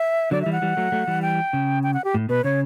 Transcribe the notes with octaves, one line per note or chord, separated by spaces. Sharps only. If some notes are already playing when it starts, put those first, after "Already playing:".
Already playing: E5
D3 F#3 D5
E3 G3 E5
F#5
E3 G3
F#3 A3
F#3 A3
E3 G3
G5
C#3
G5
F#5
G4
A2
B2 B4
C#3 C#5